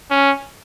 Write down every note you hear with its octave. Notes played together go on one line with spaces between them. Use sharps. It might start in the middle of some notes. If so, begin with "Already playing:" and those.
C#4